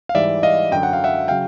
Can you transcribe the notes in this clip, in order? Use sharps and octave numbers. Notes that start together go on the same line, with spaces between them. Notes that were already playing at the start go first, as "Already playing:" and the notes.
F5
G#2 E3 G3 D5 E5
D#5 F5
F#2 D3 F#3 G5
F#5
F5
E5 F#5
C#3 F#3 F5 G5